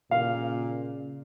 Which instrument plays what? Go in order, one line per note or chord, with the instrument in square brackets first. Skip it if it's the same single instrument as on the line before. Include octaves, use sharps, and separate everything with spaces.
[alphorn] A#2 [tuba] C#3 [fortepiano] F5